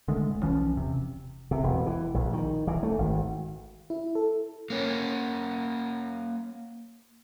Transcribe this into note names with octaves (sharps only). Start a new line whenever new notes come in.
D3 D#3 G#3 A3
D#1
B1 E3 F3 C#4
E1 C3
C3
E1
E3
A#1
D#3
E3
A3
G#1
E4
A4
A#3 C#4